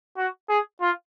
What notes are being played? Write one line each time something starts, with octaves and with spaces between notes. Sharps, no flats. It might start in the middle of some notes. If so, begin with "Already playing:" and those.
F#4
G#4
F4